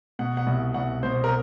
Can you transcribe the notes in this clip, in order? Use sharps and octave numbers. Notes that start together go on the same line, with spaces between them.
B2 F#5
F#5
C2
C2 F#5
B2 C5
A#4